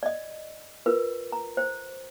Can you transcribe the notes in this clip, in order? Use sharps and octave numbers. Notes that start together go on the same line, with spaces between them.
D5 D#5
F4 A#4 B4
A#5
C5